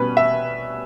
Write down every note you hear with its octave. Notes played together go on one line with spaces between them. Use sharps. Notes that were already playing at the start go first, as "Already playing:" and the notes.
Already playing: B2 G3 C#4 B4
E5